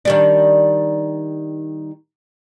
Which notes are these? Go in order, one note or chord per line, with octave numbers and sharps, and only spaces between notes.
D#3 G3 D4